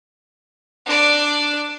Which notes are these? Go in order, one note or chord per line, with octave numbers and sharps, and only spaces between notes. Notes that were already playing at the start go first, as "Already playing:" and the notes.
D4 D5